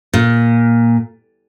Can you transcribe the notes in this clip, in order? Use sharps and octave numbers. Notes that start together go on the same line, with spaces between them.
A#2